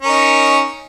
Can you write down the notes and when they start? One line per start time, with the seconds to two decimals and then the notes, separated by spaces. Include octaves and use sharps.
0.02 C#4
0.06 A#4
0.09 D#4